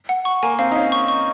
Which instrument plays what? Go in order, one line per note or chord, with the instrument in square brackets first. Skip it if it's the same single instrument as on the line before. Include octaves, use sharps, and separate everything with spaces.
[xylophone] F#5
C#6
[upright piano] A#3 [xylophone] G#5
[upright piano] C4 [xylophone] F5
[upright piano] D#4
[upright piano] C#4 [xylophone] F5
[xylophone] C#6
C#6